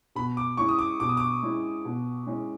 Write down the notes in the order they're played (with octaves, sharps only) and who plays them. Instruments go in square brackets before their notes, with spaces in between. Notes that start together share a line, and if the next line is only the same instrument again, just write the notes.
[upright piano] B2 [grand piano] B5
[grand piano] D6
[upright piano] G#3 C#4 E4 [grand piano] C#6
[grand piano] D#6
D6
[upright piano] B2 [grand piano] D6
[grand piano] D#6
D6
[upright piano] G#3 C#4 E4
B2
G#3 C#4 E4